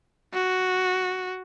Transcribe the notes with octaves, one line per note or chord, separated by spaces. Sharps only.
F#4